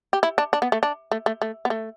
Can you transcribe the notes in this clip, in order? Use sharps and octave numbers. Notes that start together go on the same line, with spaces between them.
G4
E4
D4
D4
B3
A3
D4
A3
A3
A3
B3
A3